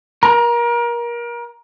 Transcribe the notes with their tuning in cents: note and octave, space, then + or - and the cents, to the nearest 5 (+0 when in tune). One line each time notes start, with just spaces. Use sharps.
A#4 +30 A#5 +0